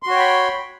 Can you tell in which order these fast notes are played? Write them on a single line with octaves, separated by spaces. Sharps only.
C6 F#4 C#5 G5 B5